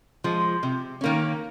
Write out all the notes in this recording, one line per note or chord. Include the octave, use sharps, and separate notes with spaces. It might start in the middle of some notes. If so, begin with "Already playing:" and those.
F3 G#3
C3
D#3 A#3 C#4